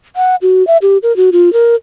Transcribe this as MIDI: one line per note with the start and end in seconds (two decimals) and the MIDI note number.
0.16 0.36 78
0.42 0.65 66
0.67 0.77 76
0.82 0.98 67
1.03 1.15 70
1.17 1.30 66
1.32 1.52 65
1.53 1.76 70